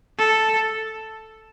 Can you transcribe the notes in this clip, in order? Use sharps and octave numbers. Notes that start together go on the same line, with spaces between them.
A4